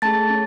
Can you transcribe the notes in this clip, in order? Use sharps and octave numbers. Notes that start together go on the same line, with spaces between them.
A3 C#4 G#4 A5 A6
C#4